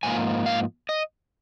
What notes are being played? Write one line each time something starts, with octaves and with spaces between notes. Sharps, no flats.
G#2 F3 A#3 G#5
F5
D#5